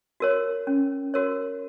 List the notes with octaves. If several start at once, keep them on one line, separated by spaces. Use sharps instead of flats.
F#4 A#4 C#5
C#4
F#4 A#4 C#5